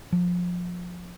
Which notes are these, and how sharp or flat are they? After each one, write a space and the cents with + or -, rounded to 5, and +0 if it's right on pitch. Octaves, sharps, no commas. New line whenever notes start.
F3 +25